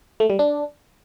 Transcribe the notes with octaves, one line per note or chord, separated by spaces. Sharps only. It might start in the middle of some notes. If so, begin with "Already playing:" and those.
A3
G3
D4